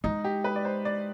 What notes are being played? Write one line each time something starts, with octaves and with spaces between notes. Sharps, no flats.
G#3 D#4
G4
B4
D5
C5
D5